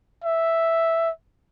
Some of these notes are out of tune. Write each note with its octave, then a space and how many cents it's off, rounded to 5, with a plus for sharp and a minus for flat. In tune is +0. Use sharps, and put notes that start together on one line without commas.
E5 +0